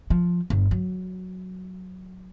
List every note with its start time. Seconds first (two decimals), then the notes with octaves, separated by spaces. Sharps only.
0.10 F3
0.50 G1
0.71 F#3